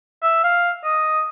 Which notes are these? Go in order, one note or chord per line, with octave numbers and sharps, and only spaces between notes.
E5
F5
D#5